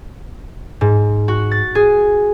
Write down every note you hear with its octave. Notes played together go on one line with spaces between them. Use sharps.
G#2
F#4
A6
G#4